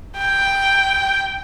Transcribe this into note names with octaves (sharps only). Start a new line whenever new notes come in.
G5